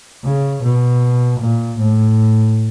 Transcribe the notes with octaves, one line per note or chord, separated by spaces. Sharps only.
C#3
B2
A#2
A2